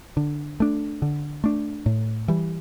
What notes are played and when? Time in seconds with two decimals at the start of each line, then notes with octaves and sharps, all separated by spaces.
0.17 D3
0.60 A3 D4
1.02 D3
1.44 A3 D4
1.86 A2
2.28 E3 G3